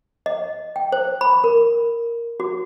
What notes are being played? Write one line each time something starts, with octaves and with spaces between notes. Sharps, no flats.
D#5
G5
C5
B5
A#4
F#4